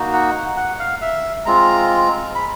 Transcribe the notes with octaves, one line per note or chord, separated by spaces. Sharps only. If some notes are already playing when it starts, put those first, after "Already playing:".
Already playing: A#3 D#4 F#4
F#5
F#5
F5
E5
G#3 C4 F4 A#5
B5